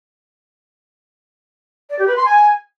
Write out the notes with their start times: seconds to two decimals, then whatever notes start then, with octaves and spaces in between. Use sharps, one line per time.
1.90 D5
1.98 G4
2.07 B4
2.16 C6
2.25 G#5